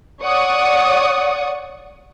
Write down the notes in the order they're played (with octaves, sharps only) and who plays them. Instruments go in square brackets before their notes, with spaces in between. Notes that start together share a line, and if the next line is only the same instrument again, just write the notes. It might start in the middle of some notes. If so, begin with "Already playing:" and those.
[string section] C#5 D5 F#5 C#6 D#6